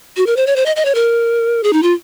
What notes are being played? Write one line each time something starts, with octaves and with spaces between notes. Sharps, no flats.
F#4
A#4
C5
C#5
C5
D#5
D#5
C#5
A#4
G#4
D#4
F4